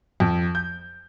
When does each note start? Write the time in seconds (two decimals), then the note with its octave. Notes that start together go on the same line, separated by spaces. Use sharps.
0.20 F2
0.55 G6